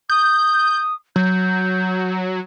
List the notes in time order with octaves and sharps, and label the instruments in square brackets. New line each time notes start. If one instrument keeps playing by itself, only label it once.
[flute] D#6 [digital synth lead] G6
[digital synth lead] F#3 [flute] G6